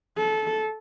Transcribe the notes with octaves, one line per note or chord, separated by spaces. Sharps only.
A4